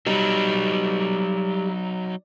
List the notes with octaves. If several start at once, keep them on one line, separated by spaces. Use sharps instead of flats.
F#3 G3 D#4